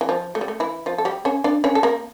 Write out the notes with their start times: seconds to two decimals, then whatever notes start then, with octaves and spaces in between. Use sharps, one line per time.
0.01 E3
0.09 F3
0.35 A3
0.41 G3
0.48 A3
0.60 E3 E4
0.86 F3 F4
0.98 A4
1.05 G3 G4
1.25 C#4 C#5
1.44 D4 D5
1.64 C#4 C#5
1.75 A4
1.83 A#3 A#4